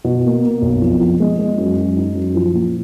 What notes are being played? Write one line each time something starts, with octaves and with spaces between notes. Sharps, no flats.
B2
A#3
A#3
B1
F2
F3
G#3
G#3
F#2
F#2
D#4
F#2
F3
A#2